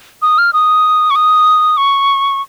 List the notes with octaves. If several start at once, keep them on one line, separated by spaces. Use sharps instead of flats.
D#6
F6
D#6
C#6
D#6
C#6